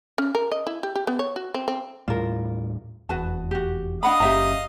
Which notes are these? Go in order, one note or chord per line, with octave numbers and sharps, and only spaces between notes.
C#4
A#4
D#5
E4
G4
G4
B3
C#5
F#4
C4
C4
D#2 A2 G3 F4 A#4
F1 E2 F#4 B4 A5
F#4 G4
D4 D#5 F5 F#5 B5 D#6
F#1 F#2 C#4 G4 E5 A#5